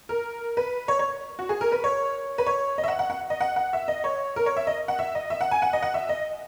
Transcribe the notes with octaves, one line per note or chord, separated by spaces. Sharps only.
A#4
B4
C#5
C#5
F#4
G#4
A#4
B4
C#5
B4
C#5
D#5
E5
F#5
F#5
F#5
D#5
F#5
F#5
E5
D#5
C#5
A#4
C#5
E5
D#5
F#5
E5
D#5
E5
F#5
G#5
F#5
D#5
F#5
E5
D#5